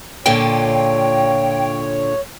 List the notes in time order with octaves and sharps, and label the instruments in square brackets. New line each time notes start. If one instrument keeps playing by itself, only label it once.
[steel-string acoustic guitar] A#2 D3 F4 [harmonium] C#5 [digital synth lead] G5